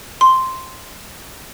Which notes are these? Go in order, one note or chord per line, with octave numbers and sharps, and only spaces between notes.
C6